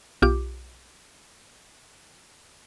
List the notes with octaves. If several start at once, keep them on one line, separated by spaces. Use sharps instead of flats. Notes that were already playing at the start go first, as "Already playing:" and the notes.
B1 F4 G4 D6